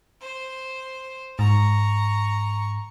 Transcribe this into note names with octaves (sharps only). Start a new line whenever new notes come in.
C5
G#2 A#5 C#6